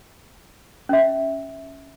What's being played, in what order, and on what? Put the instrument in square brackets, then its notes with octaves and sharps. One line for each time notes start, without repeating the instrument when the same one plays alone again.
[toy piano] C#4 E5